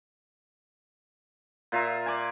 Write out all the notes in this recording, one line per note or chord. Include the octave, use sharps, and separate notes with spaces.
A#2 F4 E5 A#5
D5 G#5